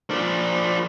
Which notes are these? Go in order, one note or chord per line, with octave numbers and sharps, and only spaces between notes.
F3 D4